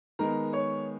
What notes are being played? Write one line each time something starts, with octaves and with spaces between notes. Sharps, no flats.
D#3 G#3 B3 A#4 A#5
C#5 C#6